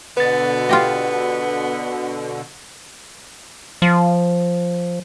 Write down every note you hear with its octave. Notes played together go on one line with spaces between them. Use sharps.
B2 D3 B3 B4 A6
F4 G4 D#5
F3